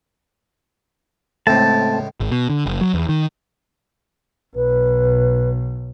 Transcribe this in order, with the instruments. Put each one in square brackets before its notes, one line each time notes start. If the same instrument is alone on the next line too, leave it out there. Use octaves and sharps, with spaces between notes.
[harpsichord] C#2 A2 [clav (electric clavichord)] A3 C4 [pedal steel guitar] A5
[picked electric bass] G#1
B2
D3
F#1
F#3
E2
D#3
[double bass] B1 [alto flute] B4